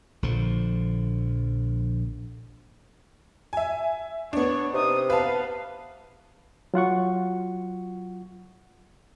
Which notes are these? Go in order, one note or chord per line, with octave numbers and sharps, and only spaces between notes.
A#1 D3 F3
E5 G#5
B3 D4 C#5
C3 D#4 D#6
B3 B4 F5 A5
F#3 F4 F#5 C#6